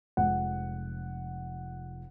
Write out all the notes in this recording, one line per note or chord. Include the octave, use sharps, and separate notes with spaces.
F1 F2 F3 G#3 F#5